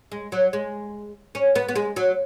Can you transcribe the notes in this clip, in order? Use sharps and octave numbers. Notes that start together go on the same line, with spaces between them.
G#3
F#3
G#3
C#4
B3
B3
G#3
F#3